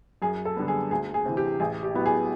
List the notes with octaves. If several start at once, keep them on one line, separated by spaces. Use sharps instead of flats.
F#2 G#4
A4
D3 G3 B3
G#4
D2 G#4
G#4
C3 E3
G4
A1 G#4
G4
A2 F#3 B3
G#4